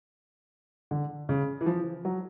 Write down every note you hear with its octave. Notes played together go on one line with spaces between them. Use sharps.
D3
C#3
E3
F3
F#3